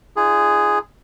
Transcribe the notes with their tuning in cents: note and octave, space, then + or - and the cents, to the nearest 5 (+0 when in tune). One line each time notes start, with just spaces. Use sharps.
D4 +40 F4 -35 G#4 +0